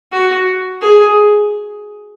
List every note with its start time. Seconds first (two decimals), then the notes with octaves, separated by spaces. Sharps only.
0.12 F#4
0.82 G#4